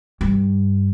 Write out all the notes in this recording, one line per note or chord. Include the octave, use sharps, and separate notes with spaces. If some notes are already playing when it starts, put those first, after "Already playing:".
G2